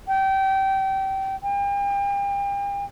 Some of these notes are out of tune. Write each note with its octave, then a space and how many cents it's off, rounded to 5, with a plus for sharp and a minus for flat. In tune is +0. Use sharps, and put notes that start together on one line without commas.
G5 -25
G5 +40